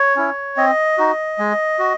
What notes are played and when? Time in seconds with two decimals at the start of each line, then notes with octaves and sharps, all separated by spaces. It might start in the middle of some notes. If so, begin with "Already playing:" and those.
Already playing: C#5
0.16 C#4 E4
0.57 C4 D#5
0.98 D#4 F#4
1.39 G#3
1.79 F#4